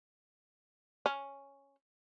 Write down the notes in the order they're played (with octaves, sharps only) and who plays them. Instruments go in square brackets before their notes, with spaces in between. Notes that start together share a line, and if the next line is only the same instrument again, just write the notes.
[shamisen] C#4